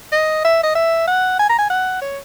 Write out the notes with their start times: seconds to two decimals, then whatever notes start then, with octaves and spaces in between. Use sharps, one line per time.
0.12 D#5
0.44 E5
0.63 D#5
0.75 E5
1.08 F#5
1.39 G#5
1.49 A#5
1.59 G#5
1.70 F#5
2.02 C#5